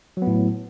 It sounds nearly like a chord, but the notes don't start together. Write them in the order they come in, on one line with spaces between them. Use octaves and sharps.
F#3 B3 A2